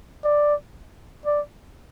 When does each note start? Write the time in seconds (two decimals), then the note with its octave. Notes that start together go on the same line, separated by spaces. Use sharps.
0.24 D5
1.25 D5